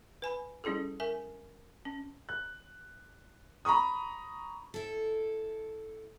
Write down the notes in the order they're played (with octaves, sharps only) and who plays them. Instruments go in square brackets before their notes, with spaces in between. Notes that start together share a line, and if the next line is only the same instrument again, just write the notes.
[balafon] B4 G#5 B5
G3 C#4 E4 G#4 A4
A#4 E5 G#5
C#4
[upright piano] F#6
A#5 B5 C#6 D#6
[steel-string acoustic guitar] E4 A4